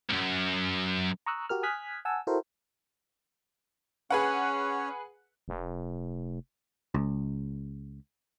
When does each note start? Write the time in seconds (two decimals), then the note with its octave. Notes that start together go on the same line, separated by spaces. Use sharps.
0.09 C2 F#2
1.26 A#5 C#6 D#6 E6 F#6
1.49 F#4 G4 A#4 F6
1.63 G#5 D#6 F6 F#6 G#6 B6
2.05 F#5 G#5 A5 E6
2.27 E4 F#4 A4 A#4 C5
4.10 C#4 G#4 B4 C#5 F#5
5.48 F1
6.94 C#2